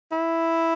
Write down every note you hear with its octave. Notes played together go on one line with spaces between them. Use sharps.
E4